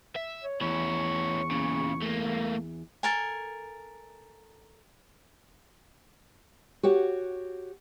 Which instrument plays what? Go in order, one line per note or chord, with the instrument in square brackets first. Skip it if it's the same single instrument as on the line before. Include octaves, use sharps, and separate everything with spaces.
[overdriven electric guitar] E5
[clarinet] C#5
[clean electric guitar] E2 [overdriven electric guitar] C#4 E4 [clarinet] C#6
[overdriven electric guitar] A#2 C#3
A3 A#3
[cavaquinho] A4 A#4 G#5
[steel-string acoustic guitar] F#4 G4 C#5 F#5